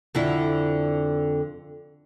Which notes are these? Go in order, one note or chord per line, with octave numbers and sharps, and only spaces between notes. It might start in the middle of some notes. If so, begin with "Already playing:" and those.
F2 D3 E4